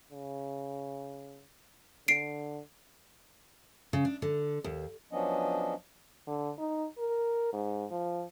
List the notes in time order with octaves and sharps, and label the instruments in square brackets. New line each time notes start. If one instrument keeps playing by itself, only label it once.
[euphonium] C#3
[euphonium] D3 [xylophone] C7 D7
[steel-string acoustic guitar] C#3
D4
D3
D#2
[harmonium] F3 F#3 B3 C#4 D4 D#5
[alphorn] D3
D#4
A#4
G#2
F3